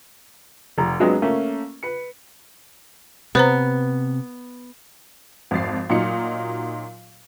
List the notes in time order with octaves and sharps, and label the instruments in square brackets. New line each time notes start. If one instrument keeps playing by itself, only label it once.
[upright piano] F1 A#5
G2 F#3 G#3 B3 C4 D4
A3 A#3 C#4
B4 C#7
[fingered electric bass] C3 [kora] B3 [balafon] B4 C5 A#5
[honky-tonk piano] G#1 F2 A6 C7
A#2 F#3 D#4 F4 C#7